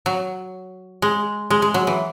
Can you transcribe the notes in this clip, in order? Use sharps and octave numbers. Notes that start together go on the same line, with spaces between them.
F#3
G#3
G#3
G#3
F#3
E3